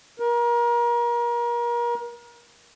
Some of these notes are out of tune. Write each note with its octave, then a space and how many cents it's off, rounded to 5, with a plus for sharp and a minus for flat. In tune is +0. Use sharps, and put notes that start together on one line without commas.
A#4 +30